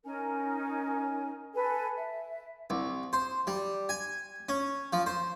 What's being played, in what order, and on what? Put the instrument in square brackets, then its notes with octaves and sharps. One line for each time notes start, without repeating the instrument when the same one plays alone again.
[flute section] C#4 D#4 A#4 G#5
A4 B4 G#5
E5
[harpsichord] C2
C5
G3
G#5
C#4
F3
C5